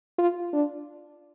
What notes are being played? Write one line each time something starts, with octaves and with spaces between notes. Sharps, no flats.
F4
D4